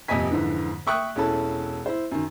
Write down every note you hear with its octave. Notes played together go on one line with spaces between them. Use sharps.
D#1 F2 C3 D#5 G#5 B6
F2 G#2 D3 E3
E5 G5 C#6 D#6 F#6
E1 C#4 E4 A4 A5
E4 C5
F#2 D#3